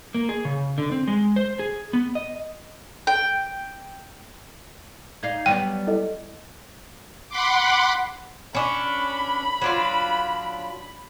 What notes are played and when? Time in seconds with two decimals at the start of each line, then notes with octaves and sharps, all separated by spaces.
0.14 A#3
0.29 G#4
0.45 C#3
0.78 D3
0.92 C4
1.08 G#3
1.36 C5
1.59 G#4
1.93 B3
2.15 D#5
3.07 G5
5.23 D#4 D5 F5 G#6
5.46 F#3 G3 B3 G5
5.87 E4 A4 D#5
7.29 F#5 B5 C6 D6
8.55 C#4 D4 B5
9.62 F#3 D4 F4